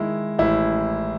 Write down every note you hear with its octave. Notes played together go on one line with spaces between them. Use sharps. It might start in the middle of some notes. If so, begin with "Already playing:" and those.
Already playing: D#3 G#3 E4
A1 E4